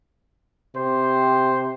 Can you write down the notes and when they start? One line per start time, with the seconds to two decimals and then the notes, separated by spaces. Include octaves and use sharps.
0.75 C3 G4 C5